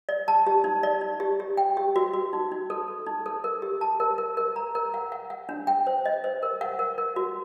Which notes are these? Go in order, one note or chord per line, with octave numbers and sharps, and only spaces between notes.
D5
A5
G4
D#4
D5
D#4
G4
G4
G5
G4
F#4
F#4
D#4
D#4
A4
A4
D#4
A4
A#4
G4
A5
A#4
A#4
A#4
A#5
A#4
F#5
F#5
F#5
D4
G5
C5
D#5
C5
A#4
F#5
A#4
A#4
F#4